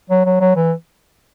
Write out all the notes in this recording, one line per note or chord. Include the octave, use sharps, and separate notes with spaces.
F#3
F#3
F#3
E3